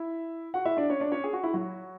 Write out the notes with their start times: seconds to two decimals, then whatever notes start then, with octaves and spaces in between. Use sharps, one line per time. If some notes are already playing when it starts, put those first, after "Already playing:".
Already playing: E4 E5
0.54 F#4 F#5
0.65 E4 E5
0.77 D4 D5
0.90 C#4 C#5
1.00 D4 D5
1.12 C#4 C#5
1.24 G#4
1.33 F#4
1.43 E4
1.53 F#3 F#4